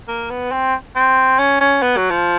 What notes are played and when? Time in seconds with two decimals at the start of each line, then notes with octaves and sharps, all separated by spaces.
0.08 A#3
0.30 B3
0.52 C4
0.96 C4
1.39 C#4
1.61 C#4
1.82 B3
1.97 F#3
2.10 F3